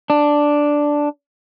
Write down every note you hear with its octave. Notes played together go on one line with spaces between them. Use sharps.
D4